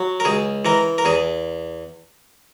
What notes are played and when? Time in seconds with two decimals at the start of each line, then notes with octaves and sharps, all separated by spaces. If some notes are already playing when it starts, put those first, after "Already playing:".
Already playing: F#3
0.20 A#4
0.25 C#2 G#4
0.65 E3 A#4
0.98 A#4
1.05 E2 G#4